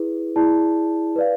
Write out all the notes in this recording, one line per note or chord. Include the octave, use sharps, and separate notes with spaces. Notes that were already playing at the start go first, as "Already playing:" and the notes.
Already playing: E4 G#4 B4
E4 G#4 D5 A5
B4 D5 F5